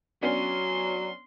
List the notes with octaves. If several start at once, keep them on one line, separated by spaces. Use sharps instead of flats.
F#3 B3 C#4 D4 C6